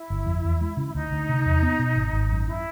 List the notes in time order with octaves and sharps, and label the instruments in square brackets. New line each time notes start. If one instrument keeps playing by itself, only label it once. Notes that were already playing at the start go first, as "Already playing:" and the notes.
Already playing: [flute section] E4
[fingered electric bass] G1
F2
E2
G#3
C#3
[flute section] E4
[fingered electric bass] D2 [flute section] D#4
[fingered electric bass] D2
C3
E2
B3
B2
G#1
G#1
F#2
[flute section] E4